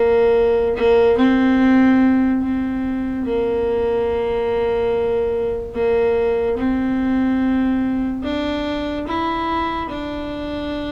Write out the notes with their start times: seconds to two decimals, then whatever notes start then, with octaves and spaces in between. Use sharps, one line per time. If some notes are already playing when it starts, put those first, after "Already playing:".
Already playing: A#3
0.75 A#3
1.17 C4
2.42 C4
3.25 A#3
5.74 A#3
6.57 C4
8.23 D4
9.07 E4
9.90 D4